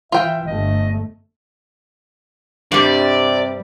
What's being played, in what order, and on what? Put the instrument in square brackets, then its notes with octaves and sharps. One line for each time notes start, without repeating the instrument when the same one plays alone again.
[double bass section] E3 [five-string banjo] F4 G5 [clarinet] E5
[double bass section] G1 A3 [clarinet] D#5
[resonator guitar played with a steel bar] G2 G3 [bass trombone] C3 [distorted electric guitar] D5